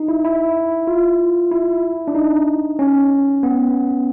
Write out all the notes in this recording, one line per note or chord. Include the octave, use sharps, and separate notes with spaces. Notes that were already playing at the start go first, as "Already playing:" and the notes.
Already playing: D#4
E4
E4
F4
E4
D4
D#4
C#4
B3